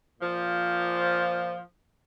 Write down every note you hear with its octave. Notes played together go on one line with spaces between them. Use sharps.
A#2 F3